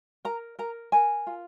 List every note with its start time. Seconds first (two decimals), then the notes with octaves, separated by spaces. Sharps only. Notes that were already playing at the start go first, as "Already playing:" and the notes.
0.25 A#4 A#5
0.59 A#4 A#5
0.92 A#4 G#5
1.27 F4